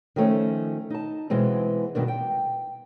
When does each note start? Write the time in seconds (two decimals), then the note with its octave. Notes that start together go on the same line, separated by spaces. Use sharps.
0.16 D#3 F3 A3 C#4
0.90 D#4 A5
1.30 B2 E3 G#3 B3 C4
1.95 G2 B2 D#3 D4
2.08 G5